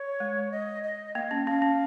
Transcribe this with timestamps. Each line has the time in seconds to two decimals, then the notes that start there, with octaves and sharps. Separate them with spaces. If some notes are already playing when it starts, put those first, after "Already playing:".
Already playing: C#5
0.20 G#3
0.52 D#5
0.84 D#5
1.15 A#3 F5
1.31 C#4
1.46 C#4 F5
1.62 C#4